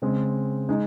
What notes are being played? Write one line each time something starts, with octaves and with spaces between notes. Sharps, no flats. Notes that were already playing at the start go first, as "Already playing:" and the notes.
C#3 G#3 C4
G#3 D#4